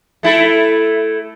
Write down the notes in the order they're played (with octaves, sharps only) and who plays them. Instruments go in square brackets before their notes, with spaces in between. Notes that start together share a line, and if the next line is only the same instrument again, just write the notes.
[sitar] A3 E4 A4